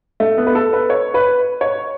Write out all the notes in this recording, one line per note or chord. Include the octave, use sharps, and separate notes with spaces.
A3
B3
B4
A4
B4
C#5
B4
C#5